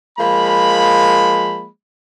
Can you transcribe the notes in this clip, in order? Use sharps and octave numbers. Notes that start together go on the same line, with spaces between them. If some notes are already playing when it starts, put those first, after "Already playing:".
F3 G#3 A#3 B5